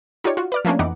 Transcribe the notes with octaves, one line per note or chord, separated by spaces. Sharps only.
D#4 F4 G4 C#5 D5
F4 F#4
B4 D5 F6
F3 A3 A#3 C#4 D4
F2 E3 D#4 F#5 D6